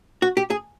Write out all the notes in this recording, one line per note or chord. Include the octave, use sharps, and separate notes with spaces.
F#4
G4
G#4